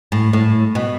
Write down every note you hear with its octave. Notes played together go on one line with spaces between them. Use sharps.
A2
A2
B2